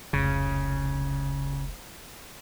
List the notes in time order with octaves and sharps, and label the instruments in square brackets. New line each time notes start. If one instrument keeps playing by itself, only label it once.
[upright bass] F1 C#2 [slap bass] C#3